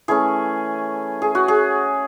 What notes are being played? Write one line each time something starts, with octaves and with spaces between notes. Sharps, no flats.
E3 A3 C#4 G#4
G#4
F#4
G#4